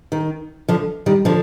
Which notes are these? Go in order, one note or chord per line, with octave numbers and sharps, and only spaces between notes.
D#3
D3 F3
D#3 G3
D3 F3